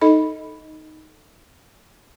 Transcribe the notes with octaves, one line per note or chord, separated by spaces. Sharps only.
D#4 A4 D#5 B5